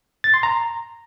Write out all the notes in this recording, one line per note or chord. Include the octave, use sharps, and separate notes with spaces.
A6
C6
A#5